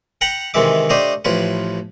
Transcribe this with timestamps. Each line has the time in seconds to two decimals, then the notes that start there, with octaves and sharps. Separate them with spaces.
0.21 F#5 G5 A#5 B5
0.54 C3 D#3 E3 G#3 E5 D6
0.90 A3 D4 G4 C5 D#5
1.25 A1 A2 F3 B4